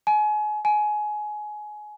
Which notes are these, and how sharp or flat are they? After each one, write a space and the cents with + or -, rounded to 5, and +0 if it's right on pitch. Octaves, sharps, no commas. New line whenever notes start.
G#5 +30
G#5 +20